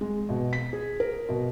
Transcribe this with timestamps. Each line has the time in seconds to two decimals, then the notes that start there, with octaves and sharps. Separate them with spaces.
0.01 G#3
0.29 B2
0.53 B6
0.73 G#4
1.00 A#4
1.29 B2